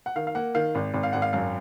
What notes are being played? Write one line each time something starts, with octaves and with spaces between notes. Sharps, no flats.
F#5
D#3 F5
F5
A#3 F#5
D#3 F5
G#1
G#1
F5
G#1 F#5
F5
F#2 F5